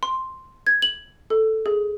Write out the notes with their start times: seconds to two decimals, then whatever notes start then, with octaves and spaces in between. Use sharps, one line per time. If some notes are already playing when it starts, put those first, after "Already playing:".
0.03 C6
0.67 G#6
0.82 F#7
1.30 A4
1.66 G#4